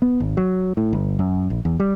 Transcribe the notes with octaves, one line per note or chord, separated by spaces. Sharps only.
B3
G#1
F#3
A2
G1
F#2
A#1
E2
G3